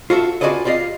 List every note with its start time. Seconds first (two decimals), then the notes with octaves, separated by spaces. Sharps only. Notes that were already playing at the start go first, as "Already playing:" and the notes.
0.10 F4 F#4 A4 E5
0.41 F4 F#4 G#4 B4 D5 D#5
0.65 F4 G4 D5 D#5 F5